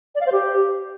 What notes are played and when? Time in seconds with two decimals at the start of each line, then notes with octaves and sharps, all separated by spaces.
0.15 D5
0.20 F5
0.26 C5
0.32 G4